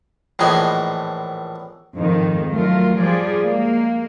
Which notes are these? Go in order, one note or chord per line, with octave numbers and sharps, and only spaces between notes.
A#1 A2 E3 G#4 D#5
F2 G#2 D#3
F#3 A3 F4 A#4
F3 G3 F4 G#4 D5
G#3 A#3